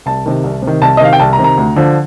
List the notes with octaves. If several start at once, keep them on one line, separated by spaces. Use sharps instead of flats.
C2 A5
C3 D#3
C2
C3 D#3
C2 A5
D#5
C3 D#3 F5
G5
C2 A5
A#5
C3 D#3
A#5
D2
D3 F3